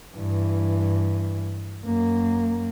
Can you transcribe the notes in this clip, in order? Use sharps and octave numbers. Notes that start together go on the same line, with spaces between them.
G2 E3
F#2 A#3